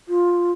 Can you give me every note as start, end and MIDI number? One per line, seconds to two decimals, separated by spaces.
0.09 0.52 65